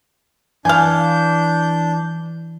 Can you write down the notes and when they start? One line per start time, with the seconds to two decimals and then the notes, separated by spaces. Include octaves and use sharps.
0.65 E3 D4 F5 G#5 G6